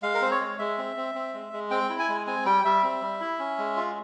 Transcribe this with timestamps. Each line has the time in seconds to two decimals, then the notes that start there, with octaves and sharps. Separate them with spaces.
0.03 G#3 F5
0.15 A#4
0.21 C4 C5
0.31 C#5
0.40 G#3
0.59 G#3 E5
0.78 C4
0.97 C4
1.15 C4
1.34 G#3
1.53 G#3
1.70 C4 G5
1.90 E4
1.99 G#5
2.09 G#3
2.27 C4 G#5
2.45 G3 G5
2.65 G3 E5
2.83 C4
3.02 G3
3.21 E4
3.39 C#4
3.58 G#3
3.77 F4